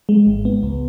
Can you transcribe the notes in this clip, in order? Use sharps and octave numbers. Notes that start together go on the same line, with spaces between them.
G#3
G#1
B3
C#2